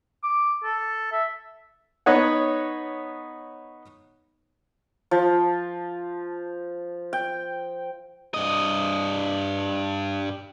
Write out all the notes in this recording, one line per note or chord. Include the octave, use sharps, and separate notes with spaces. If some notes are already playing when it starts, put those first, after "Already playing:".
D6
A4
E5
B3 D#4 C#5 F#5
F3
G5
G2 D#5